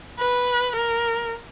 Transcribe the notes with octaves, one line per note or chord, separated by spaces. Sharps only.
B4
A#4